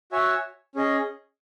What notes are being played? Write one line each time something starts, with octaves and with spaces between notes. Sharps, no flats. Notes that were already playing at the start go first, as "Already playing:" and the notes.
F#4 C#5 E5 G#5
C#4 G#4 D#5